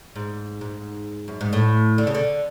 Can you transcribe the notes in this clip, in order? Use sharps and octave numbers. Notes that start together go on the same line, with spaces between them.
G#2
G#2
F#2
G#2
A2
D3
C#3
D3